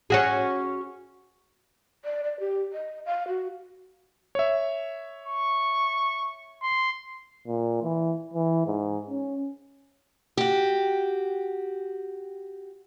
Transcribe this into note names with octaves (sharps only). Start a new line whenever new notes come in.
C#4 F#4 G#4
D5
D5
G4
D#5
F5
F#4
C#5 E5
C#6
C6
A#2
E3
E3
G#2
C#4
F#4 G4